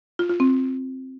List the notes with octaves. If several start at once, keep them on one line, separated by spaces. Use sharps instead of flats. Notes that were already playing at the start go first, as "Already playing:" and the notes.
F4
F4
C4